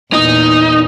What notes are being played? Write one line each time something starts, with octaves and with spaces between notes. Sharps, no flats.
E2 A#2 D#4